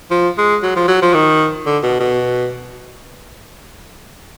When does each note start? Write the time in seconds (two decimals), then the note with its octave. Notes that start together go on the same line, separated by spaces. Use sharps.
0.11 F3
0.38 G#3
0.63 F#3
0.76 F3
0.88 F#3
1.02 F3
1.14 D#3
1.66 D3
1.83 B2
2.00 B2